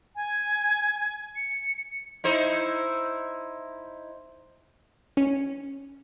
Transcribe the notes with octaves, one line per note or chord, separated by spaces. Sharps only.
G#5
C#7
D#4 E4 C5
C#4